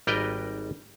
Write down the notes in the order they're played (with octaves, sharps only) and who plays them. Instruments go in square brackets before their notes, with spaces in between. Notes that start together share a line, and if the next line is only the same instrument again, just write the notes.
[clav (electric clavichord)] G#1 G3 A#4 B4 D#5 G5